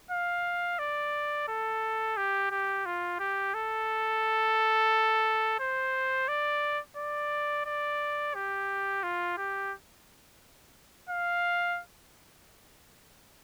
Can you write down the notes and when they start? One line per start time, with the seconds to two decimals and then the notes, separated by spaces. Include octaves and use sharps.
0.11 F5
0.79 D5
1.48 A4
2.17 G4
2.51 G4
2.86 F4
3.19 G4
3.54 A4
5.60 C5
6.28 D5
6.97 D5
7.66 D5
8.35 G4
9.03 F4
9.38 G4
11.09 F5